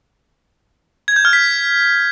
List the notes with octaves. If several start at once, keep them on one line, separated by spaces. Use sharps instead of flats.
G#6
G6
F6
B6